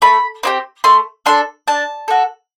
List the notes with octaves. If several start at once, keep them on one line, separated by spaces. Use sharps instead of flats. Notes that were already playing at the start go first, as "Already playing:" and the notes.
A3 B5
C4 E4 G4
A3 C6
D4 A4 C6
D4 A5
F#4 A4